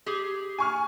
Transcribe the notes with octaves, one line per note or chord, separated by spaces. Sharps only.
G4 G#4
G#5 C#6 F6